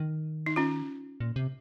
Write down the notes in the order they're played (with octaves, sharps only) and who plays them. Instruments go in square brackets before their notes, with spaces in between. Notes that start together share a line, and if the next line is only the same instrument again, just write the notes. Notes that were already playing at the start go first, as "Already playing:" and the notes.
Already playing: [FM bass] D#3
[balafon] D#4
C#4 F4
[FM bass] A#2
C3